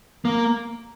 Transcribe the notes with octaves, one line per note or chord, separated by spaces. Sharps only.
A#3